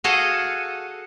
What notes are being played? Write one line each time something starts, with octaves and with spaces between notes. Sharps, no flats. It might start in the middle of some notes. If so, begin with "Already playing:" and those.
F#4 G#4 A4 D#5 F5